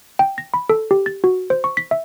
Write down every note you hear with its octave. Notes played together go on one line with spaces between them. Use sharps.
G5
A#6
B5
A4
G4
A6
F#4
C5
C#6
B6
E5